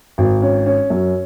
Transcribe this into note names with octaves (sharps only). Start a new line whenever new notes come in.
G#1
C#4
C#4
F#2